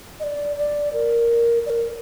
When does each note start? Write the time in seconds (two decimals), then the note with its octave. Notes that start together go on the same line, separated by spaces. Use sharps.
0.20 D#5
0.24 D5
0.57 D5
0.93 A#4
1.66 D5
1.70 A#4